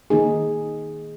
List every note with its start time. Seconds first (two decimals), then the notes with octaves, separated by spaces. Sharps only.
0.10 D#3 A#3 D#4 G#4